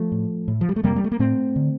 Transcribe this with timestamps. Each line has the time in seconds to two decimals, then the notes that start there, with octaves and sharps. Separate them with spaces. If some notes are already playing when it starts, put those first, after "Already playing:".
Already playing: F3 A3
0.12 A2
0.48 A2
0.61 F3
0.69 G3
0.76 A3
0.83 F2 C3 G3 A#3
0.96 G3
1.04 A3
1.12 A#3
1.19 A2 A3 C4
1.56 D3